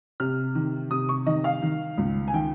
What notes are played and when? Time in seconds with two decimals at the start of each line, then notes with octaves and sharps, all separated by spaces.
0.20 C3 F6
0.55 D#3
0.90 C3 D#6
1.09 C#6
1.26 D#3 D#5
1.44 F5
1.62 D#3
1.98 C#2
2.28 G#5
2.34 D#3 G5